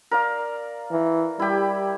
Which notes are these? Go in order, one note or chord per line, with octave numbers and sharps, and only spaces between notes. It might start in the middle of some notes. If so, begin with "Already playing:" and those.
A#4 D5 F5
E3
G3 E4 G4